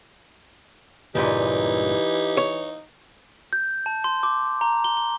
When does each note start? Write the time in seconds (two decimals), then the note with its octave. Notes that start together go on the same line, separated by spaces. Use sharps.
1.15 C#2 G2 A#2 E3 D#4 G4
2.37 C#5
3.53 G6
3.86 A5
4.04 C6
4.23 D6
4.61 A#5
4.84 G7
4.97 G7